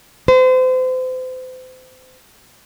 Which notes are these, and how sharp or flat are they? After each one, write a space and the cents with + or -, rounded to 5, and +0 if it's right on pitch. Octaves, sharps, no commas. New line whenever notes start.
C5 -35